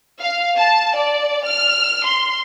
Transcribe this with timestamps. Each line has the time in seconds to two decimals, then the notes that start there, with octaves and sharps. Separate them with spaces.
0.21 F5
0.58 A5
0.97 D5
1.45 F6
2.05 C6